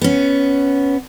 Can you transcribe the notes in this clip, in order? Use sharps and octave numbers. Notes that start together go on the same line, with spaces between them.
B3 C#4